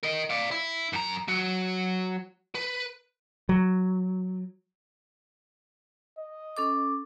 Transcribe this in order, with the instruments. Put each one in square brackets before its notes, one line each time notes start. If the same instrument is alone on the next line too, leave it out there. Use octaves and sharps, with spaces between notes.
[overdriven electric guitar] A#4 D#5
D5 F5
E4
F#2 A#5
F#3 F#4
B4
[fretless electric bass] F#3
[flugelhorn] D#5
[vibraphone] C#4 A4 D6